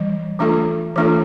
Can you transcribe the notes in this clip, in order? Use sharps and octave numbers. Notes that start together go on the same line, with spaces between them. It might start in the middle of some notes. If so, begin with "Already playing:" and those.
Already playing: E3 G3
E3 A3 D4 F4 A4
E3 A3 D4 F4 A4